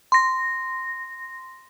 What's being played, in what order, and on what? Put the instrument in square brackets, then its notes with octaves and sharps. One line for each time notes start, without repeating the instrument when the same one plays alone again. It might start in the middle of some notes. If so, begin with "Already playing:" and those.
[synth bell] C6 A#6